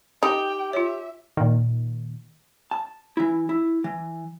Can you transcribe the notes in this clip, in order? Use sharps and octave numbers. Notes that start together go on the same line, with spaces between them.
D#4 G4 G5
F4 C#5 E5
A#2 D#3
A5
E3 E4
E4
E3